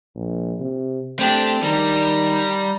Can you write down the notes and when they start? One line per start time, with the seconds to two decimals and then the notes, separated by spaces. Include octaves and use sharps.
0.15 A#1
0.60 C3
1.19 A3 C4 D4 G4
1.63 D#3 G3 A#5